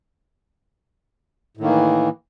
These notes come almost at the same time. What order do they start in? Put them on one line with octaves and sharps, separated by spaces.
A2 D#3 A#3 E3